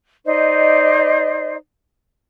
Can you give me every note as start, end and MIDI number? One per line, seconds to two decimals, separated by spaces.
0.25 1.55 63
0.25 1.55 72
0.25 1.55 74
0.25 1.55 75